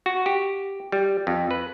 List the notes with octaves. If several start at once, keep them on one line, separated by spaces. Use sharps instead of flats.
F#4
G4
G3
F2
B4